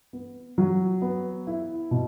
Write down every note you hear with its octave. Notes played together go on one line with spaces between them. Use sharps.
B3
F#3
B3
E4
B2